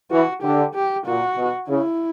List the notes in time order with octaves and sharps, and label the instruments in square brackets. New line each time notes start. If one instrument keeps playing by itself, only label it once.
[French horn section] E3 [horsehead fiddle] F#4
[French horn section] D3 [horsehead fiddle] G4
[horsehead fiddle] G4
[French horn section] A#2 [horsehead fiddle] F#4
[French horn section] B2
[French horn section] C#3 [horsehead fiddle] E4